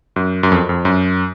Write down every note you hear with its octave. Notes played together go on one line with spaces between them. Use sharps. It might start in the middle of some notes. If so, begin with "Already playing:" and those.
F#2
F#2
F2
F2
F#2